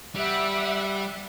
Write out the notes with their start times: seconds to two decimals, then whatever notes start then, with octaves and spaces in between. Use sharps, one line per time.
0.15 G3 E5 F#5